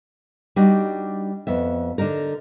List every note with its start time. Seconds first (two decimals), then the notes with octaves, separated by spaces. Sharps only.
0.56 G3 D4 D#4 F#4
1.47 F2 B3 E5
1.98 D3 D4 D#4 A#4